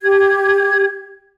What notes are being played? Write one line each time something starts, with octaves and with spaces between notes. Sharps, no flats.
G4 G#6